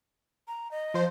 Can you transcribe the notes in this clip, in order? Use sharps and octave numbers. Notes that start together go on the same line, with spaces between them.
A#5
D#5
F3 C5